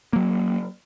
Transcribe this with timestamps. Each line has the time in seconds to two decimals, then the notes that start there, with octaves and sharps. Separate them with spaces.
0.13 F#3 A#3